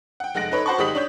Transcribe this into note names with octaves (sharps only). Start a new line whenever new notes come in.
F#5 G5
F1 G#3 F#5 F#6 A#6 D7
D#4 A4 B4 C#5
F#4 C5 F#5 A5 B5 C#6
G#1 G#3 G4 D#6 B6 F#7
D4 C#5 G6